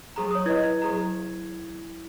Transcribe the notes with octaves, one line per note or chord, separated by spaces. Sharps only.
F#3 G#4 A#5
C#5 D#6
E4 B4 D#5 G#6
F#3 G#4 A#5